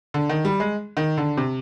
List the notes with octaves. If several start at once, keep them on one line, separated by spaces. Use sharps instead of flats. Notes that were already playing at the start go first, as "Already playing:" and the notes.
D3
D#3
G3
G#3
D#3
D3
C3